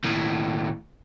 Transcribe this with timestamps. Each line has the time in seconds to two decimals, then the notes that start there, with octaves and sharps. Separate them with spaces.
0.04 D#2 A2